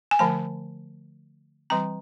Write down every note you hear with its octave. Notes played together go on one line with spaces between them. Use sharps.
G#5
D3 F3 A3 A5
E3 G3 C4 A#5